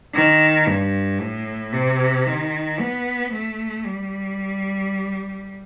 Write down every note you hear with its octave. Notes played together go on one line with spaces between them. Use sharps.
D#3
G2
A2
C3
D#3
B3
A3
G3